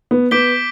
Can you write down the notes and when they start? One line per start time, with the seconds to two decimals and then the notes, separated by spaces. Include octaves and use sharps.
0.11 B3
0.31 B3 D6 G6 B6 D7 G7